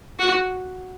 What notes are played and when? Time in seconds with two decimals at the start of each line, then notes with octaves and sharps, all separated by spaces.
0.19 F#4